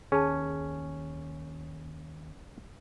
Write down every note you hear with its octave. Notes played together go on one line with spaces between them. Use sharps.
D#2 C#4 G#4 A5